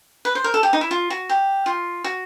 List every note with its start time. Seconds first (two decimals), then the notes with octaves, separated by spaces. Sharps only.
0.25 B4
0.35 C5
0.44 A#4
0.54 A4
0.63 G4
0.73 D#4
0.81 E4
0.91 F4
1.10 F#4
1.29 G4
1.66 F4
2.04 F#4